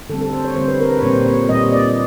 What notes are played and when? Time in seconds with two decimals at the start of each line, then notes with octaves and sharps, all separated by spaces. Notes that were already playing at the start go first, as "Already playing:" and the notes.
0.09 D3 G3 C4 A4
0.21 A4
0.33 C5
0.45 C#5
0.56 D3 G3 C4 C5
0.68 B4
0.80 A#4
0.91 B4
0.98 C#5
1.02 A#2 G3 C4 C5
1.26 C#5
1.49 A#2 G3 C4 D#5
1.72 D5